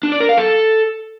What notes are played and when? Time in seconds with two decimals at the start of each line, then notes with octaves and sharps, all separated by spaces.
0.03 D4
0.12 D5
0.20 A#4
0.29 F5
0.38 A4